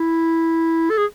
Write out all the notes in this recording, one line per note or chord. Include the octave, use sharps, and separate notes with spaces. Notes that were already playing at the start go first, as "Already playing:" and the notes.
Already playing: E4
A4
G#4